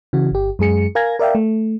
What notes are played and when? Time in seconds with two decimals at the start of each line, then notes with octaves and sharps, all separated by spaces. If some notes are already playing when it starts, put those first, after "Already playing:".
0.13 C#3 E3 F#4
0.31 G1 G4
0.59 F#2 G#3 G#4 C#7
0.95 A#4 F5 G#5 G#6 A#6
1.19 A#4 D5 E5 F5 G5
1.35 A3